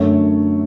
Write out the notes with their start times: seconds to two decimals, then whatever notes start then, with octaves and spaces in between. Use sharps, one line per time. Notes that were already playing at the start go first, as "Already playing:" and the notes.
Already playing: F#2 D3 A3 C#5